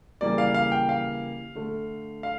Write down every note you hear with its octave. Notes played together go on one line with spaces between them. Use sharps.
C#3 E3 G3 A#3 D5
F5
F5
G5
F5
D3 A3
F5